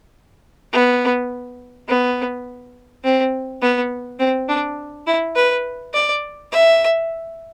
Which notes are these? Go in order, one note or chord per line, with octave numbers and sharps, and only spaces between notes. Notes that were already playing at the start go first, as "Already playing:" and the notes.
B3
B3
C4
B3
C4
D4
E4
B4
D5
E5